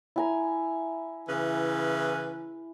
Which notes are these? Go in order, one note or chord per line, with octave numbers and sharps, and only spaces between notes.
E4 G#5 A#5
C#3 E3 B4